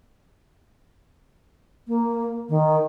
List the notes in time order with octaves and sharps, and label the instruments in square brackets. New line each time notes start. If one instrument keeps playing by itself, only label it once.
[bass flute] A#3
D#3